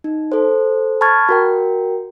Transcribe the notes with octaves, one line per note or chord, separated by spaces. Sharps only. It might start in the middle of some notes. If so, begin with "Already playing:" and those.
D#4
A4 C5
A5 B5 C#6 F6 G#6 A6
F#4 A#4 G5